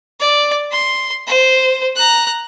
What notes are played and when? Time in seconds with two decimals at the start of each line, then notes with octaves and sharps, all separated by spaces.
0.20 D5
0.72 C6
1.27 C5
1.96 A#5 F#6